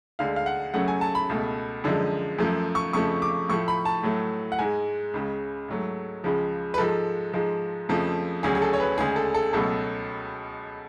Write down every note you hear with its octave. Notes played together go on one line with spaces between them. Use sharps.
D2 D3 G#3 F5
F5
F#5
F#2 C#3 F#3 A3 F#5
G#5
A5
B5
C#2 B2 A3
F#2 D3 F3 G#3
F#2 F3 A3
C#6
F2 C#3 F3 A3 C#6
D6
A2 F3 A3 C#6
B5
A5
A2 F#3 A3
F#5
G#2 G#3 G#5
C#2 C#3 G#3
G#2 F#3 A3
C#2 C#3 F3 G#3
B4
G#2 F3 G#3 A4
G#2 F3 G#3
F2 C#3 F3 A3
D2 C#3 F#3 G#4
G#4
A4
C#5
B4
D2 C#3 G#3 G#4
A4
A4
C#2 B2 F#3 A3 A4